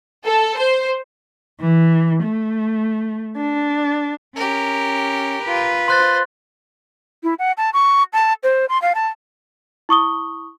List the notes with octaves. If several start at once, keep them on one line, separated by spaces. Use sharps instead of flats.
A4
C5
E3
A3
D4
C#4 G4 A#4
F4 B4
C5 C6 F#6 A6
E4
F#5
A5
C#6
A5
C5
C6
F5
A5
E4 C#6 D#6 G7